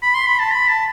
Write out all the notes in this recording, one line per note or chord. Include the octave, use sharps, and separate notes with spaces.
B5
C6
B5
A5
B5
A5